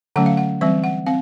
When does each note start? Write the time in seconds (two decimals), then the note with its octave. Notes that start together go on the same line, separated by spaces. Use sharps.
0.16 D3 F#3 A3 C#4 F#5
0.26 F5
0.37 F#5
0.61 E3 G3 C4 E5
0.84 F#5
1.06 C4 F5